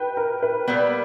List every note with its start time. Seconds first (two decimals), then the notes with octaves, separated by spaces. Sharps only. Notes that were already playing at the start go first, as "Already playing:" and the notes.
Already playing: B4 G5
0.17 A#4
0.43 B4
0.68 A#2 G3 B3